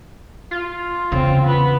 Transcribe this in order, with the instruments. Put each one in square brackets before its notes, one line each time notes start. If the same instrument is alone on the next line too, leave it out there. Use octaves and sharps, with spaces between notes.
[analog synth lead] F4
[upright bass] E2 C#3 [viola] C4
[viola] B3 B4